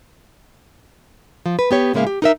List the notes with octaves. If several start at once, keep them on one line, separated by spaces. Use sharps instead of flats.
F3
B4
B3 G4 C#5
A2 C#3 G#3 A#3 E5 F5
G4
D#4 A#4 E5